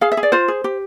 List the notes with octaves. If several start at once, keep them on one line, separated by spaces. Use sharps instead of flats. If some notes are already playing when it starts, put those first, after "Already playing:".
G#4 F5
E5
G#4
D5
F4 C5
G#4
G4